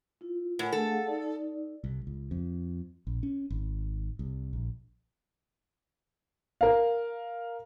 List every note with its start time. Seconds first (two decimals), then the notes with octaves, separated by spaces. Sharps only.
0.21 E4 F4
0.59 A2 A#4 F#5 G#5
0.72 A3 D4 G#4 A4
0.87 G#4 F5 F#5
1.07 D#4 D5
1.84 C2
2.07 C#2
2.31 F2
3.07 A#1
3.23 C#4
3.50 G#1
4.19 C2
4.53 A#1
6.61 A#4 F5